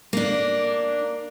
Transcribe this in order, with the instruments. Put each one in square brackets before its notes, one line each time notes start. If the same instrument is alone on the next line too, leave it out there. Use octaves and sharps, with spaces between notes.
[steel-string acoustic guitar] A#3 D4